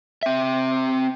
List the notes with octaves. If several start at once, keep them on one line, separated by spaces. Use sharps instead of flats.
C4 E5